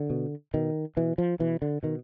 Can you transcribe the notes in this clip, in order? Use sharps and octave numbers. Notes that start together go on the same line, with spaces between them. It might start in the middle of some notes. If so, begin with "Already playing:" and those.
Already playing: D3
B2
B2 D#3
B2 E3
F3
B2 E3
D3
B2 D#3